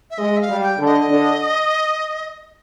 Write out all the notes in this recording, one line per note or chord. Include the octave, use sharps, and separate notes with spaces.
E5
G#3 D#5
E5
F5
G3
G5
D3
D#5
D3